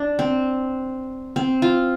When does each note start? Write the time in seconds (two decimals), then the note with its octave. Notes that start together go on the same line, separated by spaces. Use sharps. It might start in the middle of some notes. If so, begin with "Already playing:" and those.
Already playing: D4
0.19 C4
1.36 C4
1.62 F4